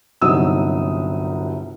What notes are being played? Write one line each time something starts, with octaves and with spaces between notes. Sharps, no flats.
G1 C2 F#3 D#4 D#6 E6